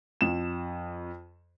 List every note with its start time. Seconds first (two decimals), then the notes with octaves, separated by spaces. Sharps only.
0.21 F2 E7